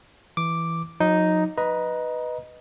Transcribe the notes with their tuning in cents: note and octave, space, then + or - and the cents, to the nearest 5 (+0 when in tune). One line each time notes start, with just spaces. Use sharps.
E3 +0 D6 +0
F#3 -40 D#4 +0
B4 +0 D#5 +0 A#5 +25